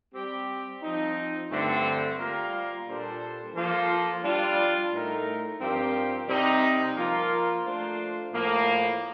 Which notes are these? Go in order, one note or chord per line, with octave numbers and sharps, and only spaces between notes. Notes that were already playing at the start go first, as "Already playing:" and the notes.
G3 C4 G4
F3 C4 D#4
G2 D3 A3 C4
G3 A#3 F4 A#4
A#2 G3 D4 A4 C5
F3 A#3 F4 A4 C5
G3 D4 F4
A2 A3 D#4 A#4
G2 F3 C4 G4 A#4
C3 G3 C4 D#4
F3 A#3 F4 A#4
A3 D4 F4 C5
A2 F3 A#3